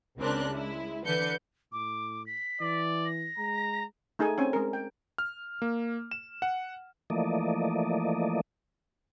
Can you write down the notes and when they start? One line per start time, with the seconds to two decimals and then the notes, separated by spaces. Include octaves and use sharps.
0.18 C#2 C#3 C4 D4 A#4 F#6
0.50 G#3 E4
1.06 D3 E3 D4 B4 G6 C#7
1.72 A2 D6
2.27 B6
2.61 E3 D5
3.05 A#6
3.38 G#3 A#5
4.19 A3 D#4 G#4 A4 G#5
4.38 C4 C#4 G#5
4.53 G#3 A#4
4.73 G5
5.18 F6
5.62 A#3
6.11 E7
6.42 F#5
7.10 E3 F3 A3 A#3 D5 D#5